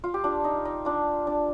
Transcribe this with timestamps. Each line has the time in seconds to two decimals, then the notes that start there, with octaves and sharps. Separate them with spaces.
0.04 F4
0.14 G4
0.24 D4 F4
0.44 D#4
0.65 D#4
0.85 D4 F4
1.27 D4